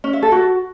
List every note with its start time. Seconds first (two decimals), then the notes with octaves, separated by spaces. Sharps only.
0.04 C#4
0.13 E5
0.22 A4
0.32 F#4